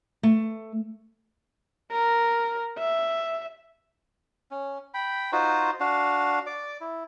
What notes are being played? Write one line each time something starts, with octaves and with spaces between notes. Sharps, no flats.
A3
A#4
E5
C#4
G5 B5
D#4 F4 F#4 C5
D4 F#4 F5
D5 D6
E4